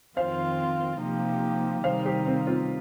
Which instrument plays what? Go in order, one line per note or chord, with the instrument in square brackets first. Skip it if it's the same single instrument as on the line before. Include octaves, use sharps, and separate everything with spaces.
[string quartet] F2 D#3 C4 F4 [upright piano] C5 F5
[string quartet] C3 F3 A#3 D#4 G4
[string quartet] C3 D#3 G3 D#4 [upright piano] C5 F5
[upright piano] G4 C5
C4
C4 F4